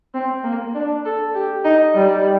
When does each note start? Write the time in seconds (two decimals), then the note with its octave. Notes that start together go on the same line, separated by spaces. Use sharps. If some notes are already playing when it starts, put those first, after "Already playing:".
0.14 C4
0.44 A#3
0.74 D4
1.05 A4
1.35 G4
1.64 D#4
1.95 G3